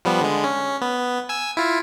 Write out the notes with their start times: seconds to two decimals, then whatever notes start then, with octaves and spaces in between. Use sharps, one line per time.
0.05 F3 G3 B3
0.21 D3 G#3
0.44 C#4
0.81 B3
1.29 G#5 E6
1.57 E4 F4